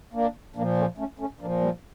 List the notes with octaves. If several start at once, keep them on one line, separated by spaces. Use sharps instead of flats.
A#3 D4
A#2 F3 A#3 D4
A3 C#4
A3 C#4
A3 C#4
A#2 F3 A#3 D4
G3 A#3